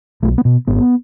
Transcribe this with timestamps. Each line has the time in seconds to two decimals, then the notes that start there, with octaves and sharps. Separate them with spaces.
0.23 B1 A3
0.38 B3
0.45 B2
0.67 G#1 B3